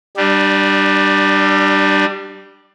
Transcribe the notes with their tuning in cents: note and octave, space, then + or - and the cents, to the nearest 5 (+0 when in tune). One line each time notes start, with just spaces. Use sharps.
G3 -10 D4 +20